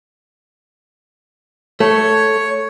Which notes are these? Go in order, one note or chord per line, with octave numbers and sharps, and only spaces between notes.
A3 C#5